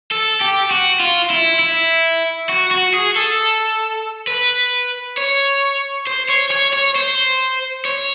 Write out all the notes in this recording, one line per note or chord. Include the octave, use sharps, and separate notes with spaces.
A4
G4
F#4
F4
E4
E4
F#4
F#4
G#4
A4
B4
C#5
C5
C#5
C#5
C#5
C5
C#5